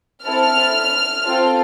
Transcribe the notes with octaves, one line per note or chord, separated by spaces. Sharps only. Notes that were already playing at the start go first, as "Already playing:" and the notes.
C4 E4 A4 F6
C4 F4 A4